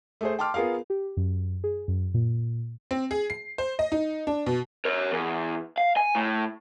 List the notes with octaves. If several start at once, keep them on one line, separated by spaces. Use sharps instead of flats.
A3 G#4 C5
G5 A5 C6 D6 F6
B3 F4 G#4 A#4 F5
G4
F#2
G#4
F#2
A#2
C4
G#4
C7
C5
D#5
D#4
D4
B2
A#4 C#5
E2
F5
G#5
A2